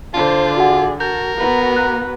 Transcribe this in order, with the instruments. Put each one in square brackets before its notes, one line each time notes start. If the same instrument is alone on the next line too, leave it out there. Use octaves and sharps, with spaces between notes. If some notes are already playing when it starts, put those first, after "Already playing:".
[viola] D3 D5 [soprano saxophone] F4 [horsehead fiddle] C5 A5
[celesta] F#4 F#5 [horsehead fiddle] G#4
[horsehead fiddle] F#4 [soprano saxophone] A#4 [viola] A5 [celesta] G6
[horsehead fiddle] B3 F#4 [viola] B4 A#5
[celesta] F#6